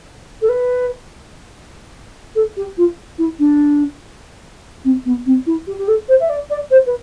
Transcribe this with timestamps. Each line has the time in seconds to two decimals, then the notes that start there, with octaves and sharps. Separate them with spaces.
0.41 A4
0.48 B4
2.35 A4
2.56 G4
2.77 F4
3.18 E4
3.39 D4
4.84 C4
5.05 B3
5.25 C4
5.46 E4
5.66 G4
5.78 G4
5.87 A4
6.08 C5
6.20 E5
6.29 D5
6.49 D5
6.70 C5
6.86 B4